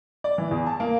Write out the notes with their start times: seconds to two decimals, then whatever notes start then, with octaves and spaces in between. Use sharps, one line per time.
0.24 D5
0.38 E3
0.51 E2
0.67 A5
0.80 A#3